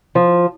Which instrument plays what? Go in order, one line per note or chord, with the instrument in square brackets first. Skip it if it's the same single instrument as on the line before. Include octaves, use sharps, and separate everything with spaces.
[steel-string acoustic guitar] F3